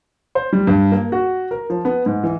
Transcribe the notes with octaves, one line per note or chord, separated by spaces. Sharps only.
C5
G3
G2
A#3
F#4
A#4
F3
B3
G#2
E3